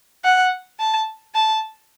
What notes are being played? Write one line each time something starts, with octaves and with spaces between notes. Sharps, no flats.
F#5
A5
A5